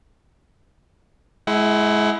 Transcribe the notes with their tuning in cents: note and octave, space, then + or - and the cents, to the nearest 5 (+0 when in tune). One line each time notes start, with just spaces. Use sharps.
G#3 +30 E4 +0 F#5 +30